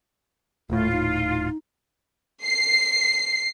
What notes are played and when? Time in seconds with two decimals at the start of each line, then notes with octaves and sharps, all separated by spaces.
0.70 D#1 A2 A3 F4
0.92 D#4
2.45 C7